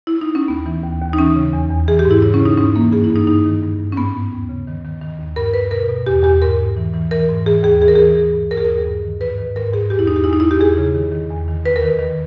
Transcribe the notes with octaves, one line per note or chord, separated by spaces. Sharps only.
E4
D#4
C#4
D#2 B3
E3
D#2
D#2
D#4
E3 C#4
C#3
E2
E2
E3 G#4
G4
G#2
E4
C#3 E4
C#4
C#3
D#4
G#2 C#4
E3 A#3
G2 G#4
E4
G2
D#4
G2 D#4
D#3
G2
G2
C#4
G#2 B3
G#2
D#2
C#3
D#3
D#3
D#3
D#2
G2 A#4
G2 B4
B2 A#4
B2
E2 G4
E2 G4
G#2 A#4
G#2
E3
E3
E3 A#4
G#2
E3 G#4
D#2 G#4
E3 G#4
A#4
E3 G#4
E3
G2
D#2 A#4
G#4
D#2 A#4
G2
D#3
G#2 B4
D#3
G#2 A#4
G#2 G#4
E2 G4
E4
E2 D#4
G4
E2 E4
D#4
E2 E4
G4
E2 G#4
C#3
D#3
D#3
E2
D#3
D#2 B4
A#4
D#3
D#3